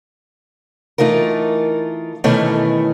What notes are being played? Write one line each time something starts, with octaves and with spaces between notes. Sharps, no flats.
E3 A3 D#4 F4 A#4
B2 D#3 E3 A3 C#4